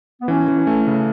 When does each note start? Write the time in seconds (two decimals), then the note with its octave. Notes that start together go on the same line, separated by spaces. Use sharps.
0.21 B3
0.28 E3 C#4
0.48 E3
0.67 A3
0.87 C#3